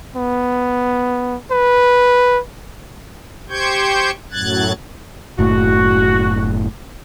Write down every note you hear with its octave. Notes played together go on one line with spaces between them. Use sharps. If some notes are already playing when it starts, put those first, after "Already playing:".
B3
B4
G4 C5 G5 C#6 G6 G#6
F#2 A2 F#3 F#6 G#6 A6
F#1 A2 F#4